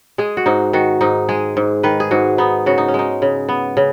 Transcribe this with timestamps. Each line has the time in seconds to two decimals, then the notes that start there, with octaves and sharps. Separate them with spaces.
0.18 G#3 G#4
0.37 F#4
0.46 G#2 D#4
0.73 D#3 F#4
1.01 G#2 D#4
1.29 G#3 G#4
1.57 G#2
1.83 D#3 B4
2.00 G#4
2.11 G#2 F#4
2.38 B3 D#4
2.66 C#3 F#4
2.78 D#4
2.88 C#4
2.94 G#3 D#4
3.22 C#3
3.49 B3
3.77 C#3